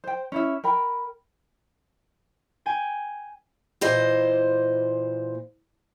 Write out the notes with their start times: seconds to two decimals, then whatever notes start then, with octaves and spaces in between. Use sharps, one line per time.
0.04 C5 G5
0.32 C#4 E4 E5
0.64 A#4 G5 B5
2.66 G5 G#5
3.81 A#2 E3 C5 D#5